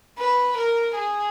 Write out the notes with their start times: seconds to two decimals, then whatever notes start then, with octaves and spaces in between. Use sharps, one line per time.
0.18 B4
0.57 A#4
0.95 G#4